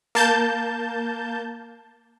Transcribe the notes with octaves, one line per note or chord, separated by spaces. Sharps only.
A#3 A5 G6